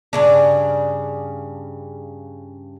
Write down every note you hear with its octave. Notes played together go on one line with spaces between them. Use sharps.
G2 C#3 D4